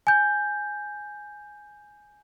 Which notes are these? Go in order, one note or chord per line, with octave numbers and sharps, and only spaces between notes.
G#5 G6